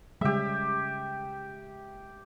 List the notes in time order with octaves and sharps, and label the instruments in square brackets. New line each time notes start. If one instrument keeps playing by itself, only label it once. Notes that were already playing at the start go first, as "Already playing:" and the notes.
[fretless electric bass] C#3 G3 [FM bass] G#3 [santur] G4 E5